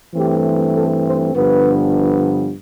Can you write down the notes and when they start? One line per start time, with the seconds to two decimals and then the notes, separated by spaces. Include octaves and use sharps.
0.14 G2 E3 A3 C4 G4
0.75 A4
1.05 C5
1.34 G2 D3 F3 B3 B4